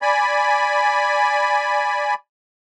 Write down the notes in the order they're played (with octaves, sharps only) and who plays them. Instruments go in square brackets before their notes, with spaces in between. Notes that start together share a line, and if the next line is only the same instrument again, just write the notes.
[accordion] D5 G#5 B5